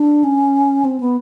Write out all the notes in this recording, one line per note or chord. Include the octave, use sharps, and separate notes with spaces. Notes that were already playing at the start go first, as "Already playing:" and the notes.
Already playing: D4
C#4
C4
B3